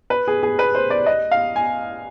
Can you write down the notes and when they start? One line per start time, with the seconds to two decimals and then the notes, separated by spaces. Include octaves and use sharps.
0.10 B4
0.28 G#4
0.43 G#4
0.59 B4
0.75 C5
0.90 D5
1.06 D#5
1.31 F5
1.56 G#5